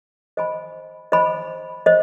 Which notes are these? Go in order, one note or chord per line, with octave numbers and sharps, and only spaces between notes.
C5 D#5 G#5 B5
C5 D#5 G#5 B5
C5 D#5